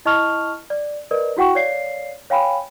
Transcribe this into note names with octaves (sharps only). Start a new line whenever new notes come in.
E4 D#5 A5 C#6 F6 F7
D5
A#4 B4 D5 D#5
E4 F#4 F#5 G5 C#6
C#5 D5 F5 C7
C#5 F5 G5 G#5 B5